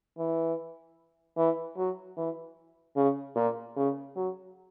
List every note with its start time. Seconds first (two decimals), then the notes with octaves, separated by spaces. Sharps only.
0.18 E3
1.37 E3
1.77 F#3
2.17 E3
2.96 C#3
3.36 A#2
3.77 C#3
4.16 F#3